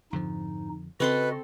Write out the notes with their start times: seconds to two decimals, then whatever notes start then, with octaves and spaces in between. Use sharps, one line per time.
0.13 F2 G#2 D3 F3 D#4
1.00 C#3 C4 F#4 A4 B4 D#5 C6